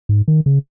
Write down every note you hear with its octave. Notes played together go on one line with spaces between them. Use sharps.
G#2
D#3
C#3